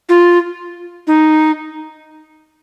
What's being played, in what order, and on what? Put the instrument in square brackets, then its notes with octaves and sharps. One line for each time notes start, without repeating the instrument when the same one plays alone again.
[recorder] F4
D#4